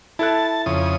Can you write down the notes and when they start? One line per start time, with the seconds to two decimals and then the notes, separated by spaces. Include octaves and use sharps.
0.19 E4 A4 A5 F#6
0.66 F2 C#3 D#6